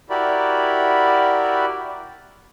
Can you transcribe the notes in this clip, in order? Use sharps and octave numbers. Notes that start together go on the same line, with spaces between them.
E4 F#4 G4 A#4 D5 B5